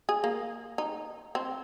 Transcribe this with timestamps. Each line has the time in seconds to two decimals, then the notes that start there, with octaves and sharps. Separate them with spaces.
0.09 G#4
0.24 A#3
0.78 D#4
1.35 C4